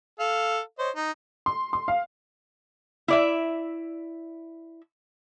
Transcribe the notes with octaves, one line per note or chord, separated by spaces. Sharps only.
A4 F5
C5 C#5 D#5
D#4
C6
C6
F5
E4 D5 E5